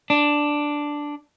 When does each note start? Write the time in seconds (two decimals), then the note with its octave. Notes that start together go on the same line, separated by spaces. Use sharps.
0.10 D4